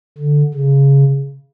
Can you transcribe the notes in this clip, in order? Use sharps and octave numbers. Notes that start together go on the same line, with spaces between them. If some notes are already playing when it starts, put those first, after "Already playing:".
D3
C#3